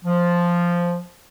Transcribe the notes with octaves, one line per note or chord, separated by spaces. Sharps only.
F3